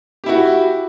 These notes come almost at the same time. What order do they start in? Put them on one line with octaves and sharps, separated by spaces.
G4 E4 F#4